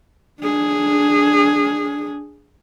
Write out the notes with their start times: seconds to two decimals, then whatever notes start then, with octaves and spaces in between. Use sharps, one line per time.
0.40 D4 G#4